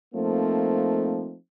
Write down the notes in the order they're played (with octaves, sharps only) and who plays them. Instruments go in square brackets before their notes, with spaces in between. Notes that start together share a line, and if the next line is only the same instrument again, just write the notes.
[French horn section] F3 A3 A#3 C4 D#4